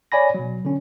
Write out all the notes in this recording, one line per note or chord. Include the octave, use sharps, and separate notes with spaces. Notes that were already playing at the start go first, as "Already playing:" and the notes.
C#5 D5 G#5 B5 A#6
B2 F#3
D3 C#4